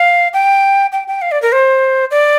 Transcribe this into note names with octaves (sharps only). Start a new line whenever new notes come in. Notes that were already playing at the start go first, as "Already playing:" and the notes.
Already playing: F5
G5
G5
G5
F5
D5
A#4
C5
D5